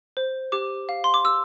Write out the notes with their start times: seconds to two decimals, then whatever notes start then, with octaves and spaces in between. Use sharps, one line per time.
0.17 C5
0.52 G4 D6
0.89 F5
1.04 C6
1.14 D6
1.24 G4 E6